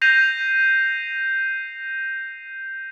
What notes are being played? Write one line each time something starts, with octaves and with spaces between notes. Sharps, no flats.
G6 A#6 C7 D#7 F7